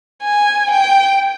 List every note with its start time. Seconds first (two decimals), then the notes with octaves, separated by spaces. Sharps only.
0.23 G#5
0.71 G5